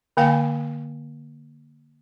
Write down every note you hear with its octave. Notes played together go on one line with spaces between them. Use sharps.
D3 A#3 F5 G5 G#5